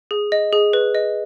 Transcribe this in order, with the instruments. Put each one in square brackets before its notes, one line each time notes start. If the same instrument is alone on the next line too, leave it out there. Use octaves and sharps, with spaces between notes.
[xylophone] G#4
D#5
G#4
B4
D#5